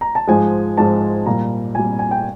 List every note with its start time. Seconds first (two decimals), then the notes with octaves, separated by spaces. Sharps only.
0.01 A#5
0.15 A5
0.27 G#2 F3 G#3 G#5
0.77 G#2 F3 G#3 A5
1.26 A#2 G3 A#5
1.75 A#2 G3 G#5
1.99 G#5
2.11 G5